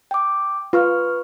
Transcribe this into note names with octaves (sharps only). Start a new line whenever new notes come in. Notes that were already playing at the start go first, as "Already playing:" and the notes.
G5 D6
F4 B4 C#6 F6